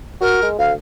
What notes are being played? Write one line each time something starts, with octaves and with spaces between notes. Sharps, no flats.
F#4 A#4
G#3
D2 F5